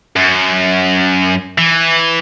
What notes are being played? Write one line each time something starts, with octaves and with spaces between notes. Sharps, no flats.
F#2
E3